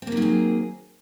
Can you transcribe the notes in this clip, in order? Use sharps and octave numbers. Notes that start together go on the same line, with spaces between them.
D#3 F#3 A#3 C4 G#4